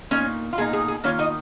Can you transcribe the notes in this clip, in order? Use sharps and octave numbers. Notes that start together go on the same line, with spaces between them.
A#2 A#3 C#4 D#4 C#5
F4
A#2 A#3 D#4 G#4
G#4
G#4
D#3 A#3 C#4 F4 C#5
D#4 D#5